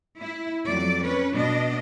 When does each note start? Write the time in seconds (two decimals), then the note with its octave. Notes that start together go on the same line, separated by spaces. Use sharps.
0.20 E4
0.66 F2 F#3 D5
1.02 C#4 B4
1.33 B2 D4 D#5